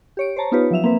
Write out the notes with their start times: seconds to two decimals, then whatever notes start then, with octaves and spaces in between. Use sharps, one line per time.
0.17 G4 C#5 D7
0.36 C5 C#5 A5 A#5
0.52 B3 D#4 F4 G4 B4 C#5
0.71 F3 F#3 E5 F7
0.84 A#3 C4 B4 E5